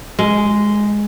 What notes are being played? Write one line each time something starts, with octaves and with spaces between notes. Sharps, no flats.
G#3